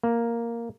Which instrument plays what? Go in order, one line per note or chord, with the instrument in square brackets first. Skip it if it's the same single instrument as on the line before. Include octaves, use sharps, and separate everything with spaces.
[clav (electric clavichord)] A#3